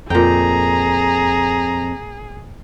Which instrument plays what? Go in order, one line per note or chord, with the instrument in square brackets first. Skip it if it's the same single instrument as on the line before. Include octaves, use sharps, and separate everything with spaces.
[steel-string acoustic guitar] F2 [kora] A#2 G5 [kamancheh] G#4 [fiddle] A#5